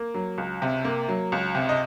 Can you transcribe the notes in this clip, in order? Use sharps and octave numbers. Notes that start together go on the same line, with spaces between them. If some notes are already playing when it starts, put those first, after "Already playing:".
Already playing: A#3
F#3
C#2
C3
A#3
F#3
C#2
C3
D#5